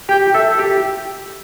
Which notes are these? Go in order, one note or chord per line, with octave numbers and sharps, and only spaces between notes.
G4 G5
A4 E5
G4